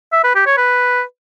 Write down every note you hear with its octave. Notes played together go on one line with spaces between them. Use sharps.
E5
B4
G4
C#5
B4